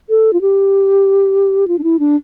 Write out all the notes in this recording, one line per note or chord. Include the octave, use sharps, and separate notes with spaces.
A4
F4
G4
F4
D4
E4
D4